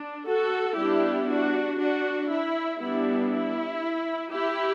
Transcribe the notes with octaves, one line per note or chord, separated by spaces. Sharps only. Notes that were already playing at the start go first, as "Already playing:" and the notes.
Already playing: D4
F#4 A4
G3 B3 D4 E4 G4
D4 F#4
D4 F#4
E4
G3 B3 D4 E4
E4
E4 G4